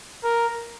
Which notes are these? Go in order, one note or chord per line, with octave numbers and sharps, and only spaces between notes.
A#4